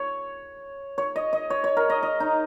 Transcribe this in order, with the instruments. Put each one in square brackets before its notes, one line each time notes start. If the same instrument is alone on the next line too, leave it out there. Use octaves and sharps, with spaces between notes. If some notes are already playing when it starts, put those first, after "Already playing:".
Already playing: [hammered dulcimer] C#5
C#5
D#5
D#5
C#5
C#5
A#4
D#5
D#5
D#4